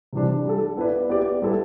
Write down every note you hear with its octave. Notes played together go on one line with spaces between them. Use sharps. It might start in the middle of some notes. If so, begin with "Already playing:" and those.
C3 E3 G3 D4
G3 D4 A4
B3 E4 B4 D5
B3 E4 G4 D5
G3 B3 E4 A4